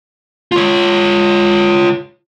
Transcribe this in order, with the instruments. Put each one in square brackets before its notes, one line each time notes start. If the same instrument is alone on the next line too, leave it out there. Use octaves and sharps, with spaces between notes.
[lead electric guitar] F4 C#5